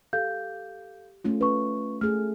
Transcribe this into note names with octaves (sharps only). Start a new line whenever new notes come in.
G4 A4 F5 G6
A3 C#4 F4
C#4 B4 C#6
A3 G#4 F6